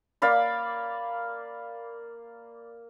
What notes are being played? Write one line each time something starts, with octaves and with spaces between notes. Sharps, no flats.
A#3 D5 F5 B5